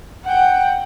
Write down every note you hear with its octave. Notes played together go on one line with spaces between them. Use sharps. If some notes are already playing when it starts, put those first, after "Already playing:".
F#5 G5